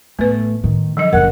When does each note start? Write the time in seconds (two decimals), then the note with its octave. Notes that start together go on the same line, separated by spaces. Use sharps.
0.19 A1 A3 B3 B4
0.64 A2 D#3
0.97 D3 F3 F#3 D#5
1.13 F#1 A#4 F#5